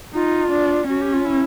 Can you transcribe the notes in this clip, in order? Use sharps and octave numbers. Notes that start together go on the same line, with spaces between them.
D#4 F4
D4
C#4 F#4
G4
F4
E4